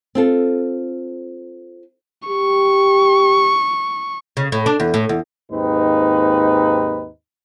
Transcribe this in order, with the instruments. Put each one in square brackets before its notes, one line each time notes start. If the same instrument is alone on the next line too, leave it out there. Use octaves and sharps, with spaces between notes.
[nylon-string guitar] C4 F4 A4
[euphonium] G4 [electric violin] C#6
[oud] C#3
A2
D4
E2
A2
E2
[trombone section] D#2 G#2 C4 D#4 B4